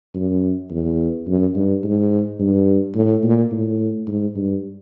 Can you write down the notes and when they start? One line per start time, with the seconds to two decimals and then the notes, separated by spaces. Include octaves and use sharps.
0.15 F#2
0.71 E2
1.27 F#2
1.55 G2
1.84 G#2
2.40 G2
2.95 A2
3.24 A#2
3.52 A2
4.07 G#2
4.36 G2